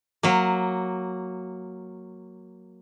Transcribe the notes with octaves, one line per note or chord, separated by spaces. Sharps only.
F#3 A#3